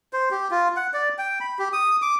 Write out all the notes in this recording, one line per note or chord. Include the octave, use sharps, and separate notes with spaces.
C5
G4
F4
F#5
D5
G5
B5
G4
D#6
D6